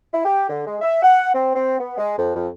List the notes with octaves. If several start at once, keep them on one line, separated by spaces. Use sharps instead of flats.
E4
G4
D3
G#3
E5
F#5
C4
C4
B3
G#3
F2
F2